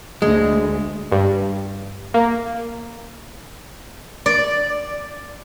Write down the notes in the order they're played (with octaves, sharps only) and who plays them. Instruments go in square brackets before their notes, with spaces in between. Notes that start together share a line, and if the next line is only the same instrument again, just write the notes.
[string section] D2 [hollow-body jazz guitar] G#3
[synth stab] G2
A#3
[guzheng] D5